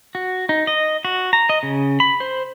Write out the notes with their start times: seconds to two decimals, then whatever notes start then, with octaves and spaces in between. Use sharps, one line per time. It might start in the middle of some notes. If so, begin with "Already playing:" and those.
0.15 F#4
0.49 D#4
0.67 D#5
1.05 F#4
1.33 A#5
1.49 D#5
1.63 C#3
2.00 B5
2.20 C5